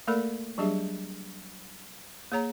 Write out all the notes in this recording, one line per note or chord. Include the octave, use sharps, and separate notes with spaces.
A3 A#3 A4 A#4 D5 B5
F#3 G3 D4 G4 G#4 E5
A#3 G#4 C#5 A#5